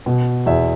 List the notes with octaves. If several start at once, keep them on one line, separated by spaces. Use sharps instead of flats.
B2
E2 E5